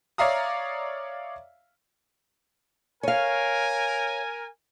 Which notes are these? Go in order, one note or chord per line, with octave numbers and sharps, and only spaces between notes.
C#5 D5 E5 F5 A#5 D#6
A#4 C#5 F5 G#5